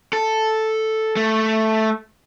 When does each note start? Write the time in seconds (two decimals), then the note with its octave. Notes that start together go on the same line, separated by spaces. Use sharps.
0.13 A4
1.16 A3